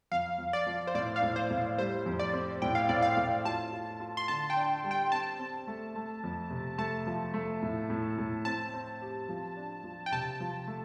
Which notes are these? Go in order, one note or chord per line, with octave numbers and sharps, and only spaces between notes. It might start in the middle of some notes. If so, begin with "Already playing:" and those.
F2 F5
F2
D5
F3
C5
A2 D5
F5
A2
C5
A2
G3 C5
F2
D5
C4
A2 G5
F5
A2 D5
F5
A2
F4 A5
F4
F4
C6
D3 A5
G5
D4
G3
G5
C4 A5
C4
A3
A3
F2
C3
A3 A5
F3
A3
A2
A2
A2
C4 A5
C4
G4
F3
D4
F3
G5
C3 A5
F3
A3